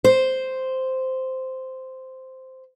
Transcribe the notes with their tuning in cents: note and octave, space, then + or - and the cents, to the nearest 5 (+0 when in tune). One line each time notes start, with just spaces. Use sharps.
C5 -5